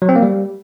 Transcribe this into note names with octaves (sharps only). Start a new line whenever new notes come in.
F#3
C4
A#3
G3